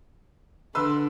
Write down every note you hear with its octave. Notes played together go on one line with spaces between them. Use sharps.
D3 D4 B4 C6 E6